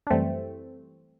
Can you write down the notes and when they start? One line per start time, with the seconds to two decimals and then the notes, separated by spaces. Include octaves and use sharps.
0.07 D4
0.10 F#2 E3 G3 A3 C4